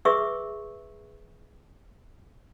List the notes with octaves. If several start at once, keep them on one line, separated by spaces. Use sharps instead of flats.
G#4 B4 E5 C6 C#6 E6